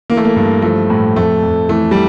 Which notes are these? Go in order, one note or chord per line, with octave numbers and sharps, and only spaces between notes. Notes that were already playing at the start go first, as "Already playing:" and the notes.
E3 A#3
A3
A#3
G2
F3 A3
A2
F2 A3
F2
E3 A3
G3